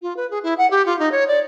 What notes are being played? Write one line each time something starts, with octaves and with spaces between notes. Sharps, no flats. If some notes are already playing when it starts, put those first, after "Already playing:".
F4
B4
G#4
E4
F#5
G4
F4
D#4
C#5
D5